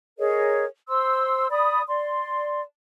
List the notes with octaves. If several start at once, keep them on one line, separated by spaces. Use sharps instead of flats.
G#4 A#4 C#5 D#5
C5 C6 E6
D5 B5 D#6
D5 C6